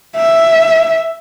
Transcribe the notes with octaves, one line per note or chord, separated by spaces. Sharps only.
E5